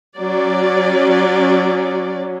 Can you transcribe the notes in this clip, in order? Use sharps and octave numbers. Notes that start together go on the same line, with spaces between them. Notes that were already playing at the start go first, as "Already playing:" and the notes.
F#3 C#4 D5